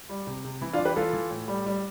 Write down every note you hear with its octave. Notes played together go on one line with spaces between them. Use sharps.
G3
C3
C3
E3 E4
D4 F4
E3
G4 B4
E3 F4 A4
E3
A2
G3
G3